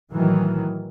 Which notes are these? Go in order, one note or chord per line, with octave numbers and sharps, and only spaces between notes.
A2 D#3 E3 F#3